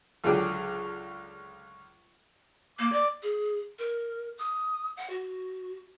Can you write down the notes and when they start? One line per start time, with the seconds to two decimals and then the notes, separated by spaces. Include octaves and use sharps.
0.24 C#2 D3 F#3 G#4 G5 D6
2.79 A#3 D6
2.92 D5 D6
3.23 G#4
3.79 A#4
4.38 D#6
4.97 F#5
5.10 F#4